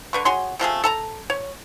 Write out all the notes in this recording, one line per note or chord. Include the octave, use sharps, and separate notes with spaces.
D3 B4 C#6
F#4 G#4 C#5 C6
C3 F3 A3 G#4
A4 A5 A#5
C#5